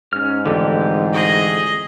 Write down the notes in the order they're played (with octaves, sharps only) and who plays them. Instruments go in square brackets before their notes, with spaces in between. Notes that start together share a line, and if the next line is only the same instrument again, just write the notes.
[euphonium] G#2 [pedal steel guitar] C#4 F6
[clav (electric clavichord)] F2 D3 [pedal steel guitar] E3 A3 G4
[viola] G#4 D#5